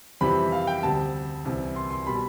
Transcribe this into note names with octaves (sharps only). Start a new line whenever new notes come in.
F2 C3 E3 G3 B5
F5
G5
D2 C3 G3 A5
C2 C3 E3
C6
C6
B2 G3 B5